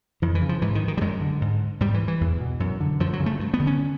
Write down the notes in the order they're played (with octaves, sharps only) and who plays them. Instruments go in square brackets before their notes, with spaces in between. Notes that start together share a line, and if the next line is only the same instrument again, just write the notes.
[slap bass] F2 E3
E3
C#3
F3
G#2 E3
D#3
D#3
G3
F#2 G#3
D3
G#2
G#2 G3
E3
E3
E2
B2
F#2
D3
F#2 F3
F#3
C#3
A3
G2
B3
D3
C#4